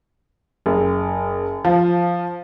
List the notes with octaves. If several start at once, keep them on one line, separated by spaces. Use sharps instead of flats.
F#1
F3